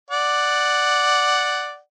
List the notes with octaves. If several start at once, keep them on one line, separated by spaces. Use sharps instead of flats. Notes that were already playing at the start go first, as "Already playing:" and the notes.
D5 F#5